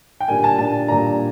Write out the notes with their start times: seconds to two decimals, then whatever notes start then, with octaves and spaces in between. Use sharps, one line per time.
0.20 G5
0.28 A#2 G3 A#3 D4 G#5
0.38 G#5
0.44 A5
0.58 A#2 G3 A#3 D4 A5
0.88 A#2 G3 A#3 D4 A#5